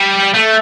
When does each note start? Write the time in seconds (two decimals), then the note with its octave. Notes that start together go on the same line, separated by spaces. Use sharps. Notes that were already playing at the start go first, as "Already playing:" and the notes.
Already playing: G3
0.34 A3